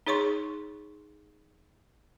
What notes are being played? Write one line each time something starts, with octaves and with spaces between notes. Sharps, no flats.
D#4 G#4 C#5 C6 C#6